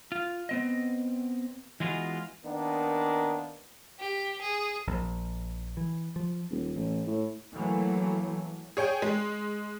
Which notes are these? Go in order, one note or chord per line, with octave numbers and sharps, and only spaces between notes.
F4
B3 C4 D#5
E3 G#3 B3 F4 F#4
D#3 A#3 B3 D4
G4
G#4
A#1
E3
F3
D#1
A1
A2
E3 F#3 A3 A#3
G#4 C#5 G5 G#5
G#3